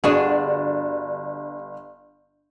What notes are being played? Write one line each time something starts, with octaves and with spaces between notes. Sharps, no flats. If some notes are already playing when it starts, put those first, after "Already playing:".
G1 D4 F#4 G#4